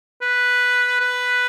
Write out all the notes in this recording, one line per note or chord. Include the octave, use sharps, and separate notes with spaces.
B4
B4